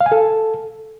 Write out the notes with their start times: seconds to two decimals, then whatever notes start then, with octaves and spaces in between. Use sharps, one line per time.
0.01 F5
0.06 G#5
0.12 A4